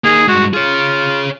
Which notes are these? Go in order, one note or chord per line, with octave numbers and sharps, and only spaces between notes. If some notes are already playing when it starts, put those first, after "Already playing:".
A#3 D#4 G#4
G2 G#3 F#4
F4 G#4 C#5